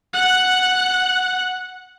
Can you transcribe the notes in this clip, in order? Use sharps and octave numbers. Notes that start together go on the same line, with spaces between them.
F#5 F#6